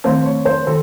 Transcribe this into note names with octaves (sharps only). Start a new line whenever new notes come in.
D#3 A3 C4 C5
C#5
C5
D#3 A4